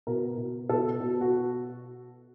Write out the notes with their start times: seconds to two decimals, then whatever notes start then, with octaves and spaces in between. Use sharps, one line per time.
0.07 B2 A#4
0.37 B2
0.69 B2 A4
1.00 B2
1.21 F#4